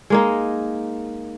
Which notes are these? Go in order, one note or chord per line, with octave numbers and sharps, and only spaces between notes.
G#3 A#3 D#4